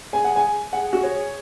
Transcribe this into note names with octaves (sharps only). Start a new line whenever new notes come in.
G#4 G#5
F#5
G#5
G#4 F#5
F#4
C#5